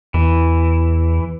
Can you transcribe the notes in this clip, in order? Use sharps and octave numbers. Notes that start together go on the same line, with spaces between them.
E2 E3